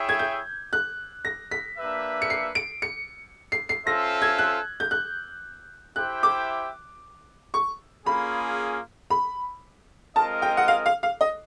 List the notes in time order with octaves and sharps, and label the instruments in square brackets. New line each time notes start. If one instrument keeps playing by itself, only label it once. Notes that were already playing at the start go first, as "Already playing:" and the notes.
Already playing: [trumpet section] E4 G#4 C#5 E5 G5
[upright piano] G#6
G6
F#6
A#6
B6
[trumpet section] A#3 D4 G4 B4 E5
[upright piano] C#7
C7
D7
C#7
C7
C7
[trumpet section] C#4 F4 A4 C5 E5 [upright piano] A#6
[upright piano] G#6
F#6
G6
F#6
[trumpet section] E4 G4 C5 E5 G5 [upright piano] F#6
[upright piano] D6
C#6
[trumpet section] A#3 C#4 F4 G#4 [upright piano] B5
[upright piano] B5
[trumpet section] G#3 C4 F4 A#4 D#5 [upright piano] A5
[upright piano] G5
F#5
F5
F5
F5
D#5